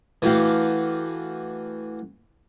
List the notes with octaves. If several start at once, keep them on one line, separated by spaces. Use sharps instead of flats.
E3 A3 F#4 G4 F5